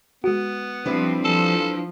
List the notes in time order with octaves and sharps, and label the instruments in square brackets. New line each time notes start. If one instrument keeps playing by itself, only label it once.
[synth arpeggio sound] G#3 F#4 [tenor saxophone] B3
[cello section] F3 G3 C4 [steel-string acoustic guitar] D4 E4 B4
[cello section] F3 [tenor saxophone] A4